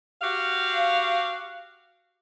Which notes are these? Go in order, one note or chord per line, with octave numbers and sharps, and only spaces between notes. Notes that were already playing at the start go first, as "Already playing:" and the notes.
F#4 G4 F5